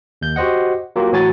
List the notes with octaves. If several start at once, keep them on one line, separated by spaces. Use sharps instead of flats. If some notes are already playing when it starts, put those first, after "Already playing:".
D#2 G6
F#4 G4 C5 D#5 F#5
F#3 A#3 F4 G4
A2 E3 F#3 F#4 G#5 A6